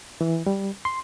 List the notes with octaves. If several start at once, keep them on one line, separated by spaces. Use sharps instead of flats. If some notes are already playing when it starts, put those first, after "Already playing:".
E3
G3
C6